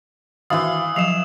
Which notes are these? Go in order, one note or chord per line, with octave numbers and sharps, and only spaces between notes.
D#3 E3 F#4 F5 C6 D#6 E6
F3 F#3 E7 F7